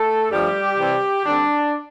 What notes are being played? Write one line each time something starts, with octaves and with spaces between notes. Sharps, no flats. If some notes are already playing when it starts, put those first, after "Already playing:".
Already playing: A3 A4
G2 F3 G3 A3 G4
C3 E3 G3 C4
D3 G3 C4 D4